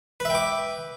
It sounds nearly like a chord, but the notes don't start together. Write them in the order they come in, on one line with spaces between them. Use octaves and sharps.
B4 E5 G5 D6